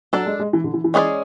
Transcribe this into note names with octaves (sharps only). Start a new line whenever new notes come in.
F#3 D4 A4 D5
G#3
G#3
E3
D3
E3
E3
G#3 C#4 G#4 B4 D5